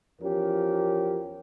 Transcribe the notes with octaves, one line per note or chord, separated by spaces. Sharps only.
E2 F3 C#4 G4 A#4